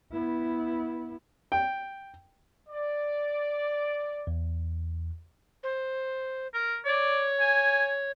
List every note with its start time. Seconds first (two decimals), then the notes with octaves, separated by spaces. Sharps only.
0.12 B3 E4
1.52 G5
2.69 D5
4.27 E2
5.63 C5
6.54 A#4
6.85 C#5 D5
7.40 G#5